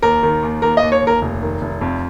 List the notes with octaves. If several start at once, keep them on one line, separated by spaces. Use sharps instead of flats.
D#2 A#4
D#3
D#2
D#2 A#4
D#5
D#2
C#5
D#2
A#4
F1
D#3
F1
F2